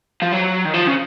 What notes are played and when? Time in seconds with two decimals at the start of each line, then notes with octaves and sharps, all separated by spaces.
0.22 F3
0.33 F#3
0.65 D#3
0.74 F3
0.87 C#3